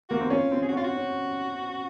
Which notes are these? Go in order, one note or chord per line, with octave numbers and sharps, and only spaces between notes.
A#3 F#4
C4
C#4 F4
C4
G#4
F#4
C#4 F4
F#4
C#4